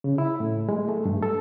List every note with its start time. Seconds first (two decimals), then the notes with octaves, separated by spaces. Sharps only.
0.04 C#3
0.18 E4
0.40 A2
0.69 G#3
0.89 A3
1.05 G2
1.23 A4